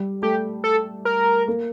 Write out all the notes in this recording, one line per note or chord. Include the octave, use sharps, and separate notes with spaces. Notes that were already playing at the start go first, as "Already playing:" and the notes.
Already playing: G3
A3 G4
A4
A#4
A#3